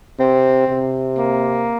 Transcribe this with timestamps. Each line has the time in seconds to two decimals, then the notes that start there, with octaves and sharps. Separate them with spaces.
0.19 C3 C4
0.68 C3
1.18 A#3